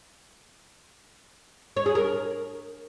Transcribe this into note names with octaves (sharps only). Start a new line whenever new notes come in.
C#5
G#4
A#4